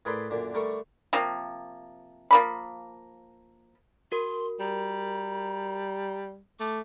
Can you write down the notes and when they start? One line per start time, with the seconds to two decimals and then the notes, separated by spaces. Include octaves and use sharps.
0.05 A2 G#4 A#4 B4 D5 C6
0.30 F#2 A#2 D3
0.54 D3 G3 A3 A#4 C#6
1.13 C3 F3 A#3
2.31 F3 A#3 B5
4.12 F#4 A#4 C6
4.60 G3 A#5
6.60 A3 D6